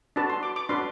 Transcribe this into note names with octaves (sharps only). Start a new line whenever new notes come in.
D4 F#4 B4 A5
C6
D6
D6
D4 F#4 B4 C6